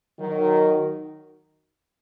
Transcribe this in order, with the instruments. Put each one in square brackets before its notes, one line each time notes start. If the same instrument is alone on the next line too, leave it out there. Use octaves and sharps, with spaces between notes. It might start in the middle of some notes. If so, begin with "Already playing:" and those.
[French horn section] D#3 F#3